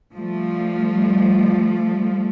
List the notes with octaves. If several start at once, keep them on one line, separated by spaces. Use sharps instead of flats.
F3 G3 A3